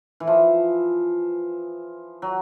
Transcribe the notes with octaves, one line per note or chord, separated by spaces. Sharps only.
E3
F3
F#3